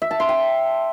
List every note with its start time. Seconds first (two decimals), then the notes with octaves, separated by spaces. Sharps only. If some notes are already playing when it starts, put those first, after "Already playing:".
0.02 E5
0.11 A5
0.20 C6
0.29 G5